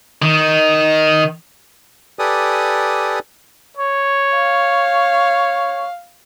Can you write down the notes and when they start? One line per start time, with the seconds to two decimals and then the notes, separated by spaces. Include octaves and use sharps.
0.22 D#3
2.19 G4 A4 B4 D5 G#5 D#6
3.77 C#5
4.36 F5